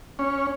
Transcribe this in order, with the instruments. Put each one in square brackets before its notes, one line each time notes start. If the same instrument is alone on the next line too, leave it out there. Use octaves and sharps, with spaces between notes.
[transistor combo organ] C#4